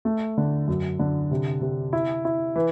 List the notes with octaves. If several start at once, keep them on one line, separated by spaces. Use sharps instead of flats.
A3
D3
F#2
D3
C3
C3
E4
E4
E3